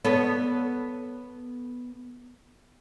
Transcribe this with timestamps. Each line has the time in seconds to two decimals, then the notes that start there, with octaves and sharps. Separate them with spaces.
0.05 B3 A4 C#5